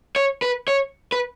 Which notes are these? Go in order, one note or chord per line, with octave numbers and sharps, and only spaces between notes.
C#5
B4
C#5
B4